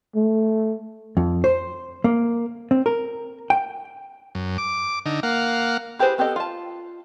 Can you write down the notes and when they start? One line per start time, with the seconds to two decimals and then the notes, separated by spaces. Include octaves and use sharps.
0.16 A3
1.17 F2
1.44 C5
2.04 A#3
2.71 C4
2.86 A#4
3.50 G5
4.35 F#2
4.58 D6
5.06 D3 D#4
5.23 A#3 F5 F#5
5.99 E4 G4 G#4 B4 C5
6.18 B3 C4 G4 A4 D#5
6.36 F4 A5